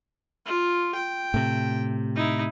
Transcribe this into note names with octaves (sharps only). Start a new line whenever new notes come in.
F4
G5
A2 C3
D#4 E4